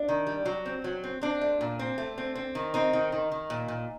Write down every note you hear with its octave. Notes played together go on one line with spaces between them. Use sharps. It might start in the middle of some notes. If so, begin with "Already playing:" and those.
Already playing: D4
D#3
G3
F#3
C4
F#3
C4
C4 D4
A3
A#2
C4
A3
C4
C4
D#3
C4 D#4
D#3
D#3
D#3
A#2
A#2